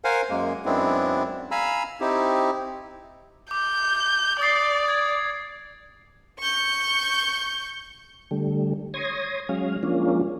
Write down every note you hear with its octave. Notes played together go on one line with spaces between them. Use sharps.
A#4 C5 F5 F#5 G#5
F#2 G#3 A#3
F#2 G#3 B3 C4 D4 E4
F5 G#5 A#5 B5 E6
C4 D#4 E4 G4
D6 G6
D5 D#6 A6 C7
G#6
C#6 G6
D3 G3 A3
C#5 C6 D#6 G#6 A#6
F#3 G#3 C#4 F5
F3 G#3 A#3 C#4 D4 F4